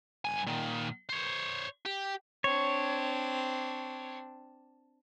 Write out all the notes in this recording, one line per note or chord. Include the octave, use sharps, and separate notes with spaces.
G2 G#5
A#2 D#3
C5 C#5
G4
C4 D4 C#5